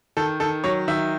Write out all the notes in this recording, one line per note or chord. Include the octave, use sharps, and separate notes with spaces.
D#3 A4
D#3 A4
F#3 C#5
D#3 E5